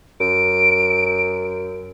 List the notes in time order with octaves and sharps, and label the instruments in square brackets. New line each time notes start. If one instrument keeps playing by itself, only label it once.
[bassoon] F#2 [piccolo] D7